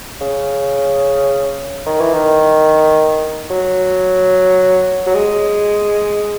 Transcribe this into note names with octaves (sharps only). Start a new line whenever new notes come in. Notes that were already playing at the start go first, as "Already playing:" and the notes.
C#3
D#3
E3
D#3
F#3
F#3
G#3